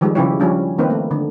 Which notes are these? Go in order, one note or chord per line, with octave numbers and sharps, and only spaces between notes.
D#3 F3 G3 G#3
C#3 F3 C#4 E4 G4 C#5
F3 G3 C#4 D4
D#3 A#3 C4 D#4 B4
A3
D3